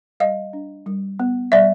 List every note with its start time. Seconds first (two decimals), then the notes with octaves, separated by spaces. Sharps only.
0.20 G3 D#5 F5
0.53 D4
0.86 G3
1.20 B3
1.52 G3 D5 E5